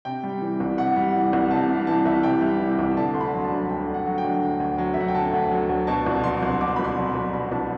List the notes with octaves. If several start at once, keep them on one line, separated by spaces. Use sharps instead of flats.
C3 G5
G3
E3
C2
C3 F#5
G3
E3
C2
C3 A5
G3 A5
E3 A5
C2 E5
C3 G5
G3
E3
C2
D3 A5
D2 C6
B5
F#3
A5
D2
D3 G5
D2
F#5
F#3
G5
D2
D3
D2
F#3
E5
D2 F#5
G5
D3 A5
D2
F#3
D2
B2 A5
C2
F#3 C6
C2
B2 D6
C6
B5
C2 C6
F#3
C2
B2 B5
C2 A5